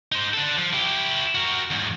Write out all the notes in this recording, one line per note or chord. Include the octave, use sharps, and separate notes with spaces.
D#4 C5
D4 A4
F3
E4 G4
F#4 A#4
E2 G#2